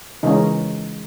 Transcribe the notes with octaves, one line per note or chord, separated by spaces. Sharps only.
C#3 E3 G#3 C#4 D#4